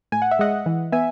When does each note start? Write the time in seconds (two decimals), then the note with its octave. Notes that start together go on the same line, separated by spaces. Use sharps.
0.12 A2 G#5
0.22 F#5
0.31 E5
0.39 G#3 D#5 F#5
0.66 E3
0.92 B3 E5 G#5